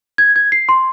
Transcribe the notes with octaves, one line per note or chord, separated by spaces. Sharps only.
G#6
G#6
C7
C6